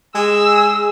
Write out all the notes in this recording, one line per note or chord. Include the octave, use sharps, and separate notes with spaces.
G#3 G#4 E6